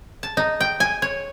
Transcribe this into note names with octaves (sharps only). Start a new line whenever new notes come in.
A5
D#4
G5
G#5
C#5